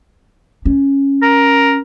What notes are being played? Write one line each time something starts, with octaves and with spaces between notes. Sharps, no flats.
C#4
A#4